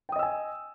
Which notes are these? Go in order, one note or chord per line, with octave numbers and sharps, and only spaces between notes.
D#5 G5 G#5 D#6 E6